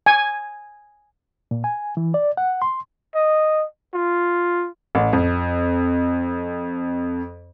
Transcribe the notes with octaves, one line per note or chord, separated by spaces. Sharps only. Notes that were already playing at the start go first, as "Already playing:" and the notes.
G#5
A#2
G#5
E3
D5
F#5
C6
D#5
F4
A1
F2